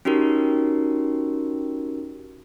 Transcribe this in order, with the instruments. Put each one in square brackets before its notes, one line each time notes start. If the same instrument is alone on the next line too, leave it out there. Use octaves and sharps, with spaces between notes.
[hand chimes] C#4 D#4 F#4 G4 A#4